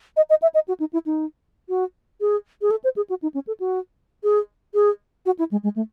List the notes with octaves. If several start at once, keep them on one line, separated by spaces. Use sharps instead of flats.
D#5
D#5
E5
D#5
F#4
D#4
E4
D#4
F#4
G#4
G#4
A4
C5
G#4
F#4
D#4
C#4
A4
F#4
G#4
G#4
F#4
E4
G#3
G#3
A3